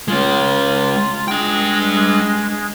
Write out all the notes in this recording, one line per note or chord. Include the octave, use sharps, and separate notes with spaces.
G#3 C#4 F4
G#3 D4 G5